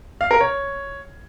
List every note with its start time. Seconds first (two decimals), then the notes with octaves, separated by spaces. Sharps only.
0.21 F5
0.31 A#4
0.41 C#5